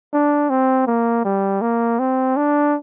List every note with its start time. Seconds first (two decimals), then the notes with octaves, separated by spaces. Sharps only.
0.13 D4
0.50 C4
0.87 A#3
1.25 G3
1.61 A#3
1.99 C4
2.36 D4